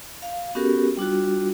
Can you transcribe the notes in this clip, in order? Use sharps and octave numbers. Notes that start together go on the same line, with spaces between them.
F5
B3 C#4 F#4 G4 A4 A#4
G3 D4 F4 F#4